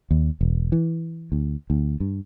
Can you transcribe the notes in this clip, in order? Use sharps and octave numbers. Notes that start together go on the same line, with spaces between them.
D#2
E1
E3
D2
D2
G2